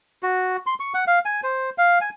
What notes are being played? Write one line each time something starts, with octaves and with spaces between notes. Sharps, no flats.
F#4
C6
C#6
F#5
F5
G#5
C5
F5
G#5